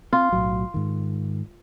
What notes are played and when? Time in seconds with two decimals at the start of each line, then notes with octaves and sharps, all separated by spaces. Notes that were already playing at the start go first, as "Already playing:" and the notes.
0.13 C4 F4
0.32 B1 A2 F#3
0.74 G#2 D#3